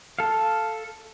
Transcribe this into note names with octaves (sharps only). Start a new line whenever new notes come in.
A4 F5